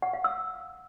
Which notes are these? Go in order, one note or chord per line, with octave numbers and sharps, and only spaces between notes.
F#5
F5
E6